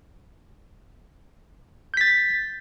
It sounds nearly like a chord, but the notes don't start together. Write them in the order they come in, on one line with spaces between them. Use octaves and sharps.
G6 B6 A6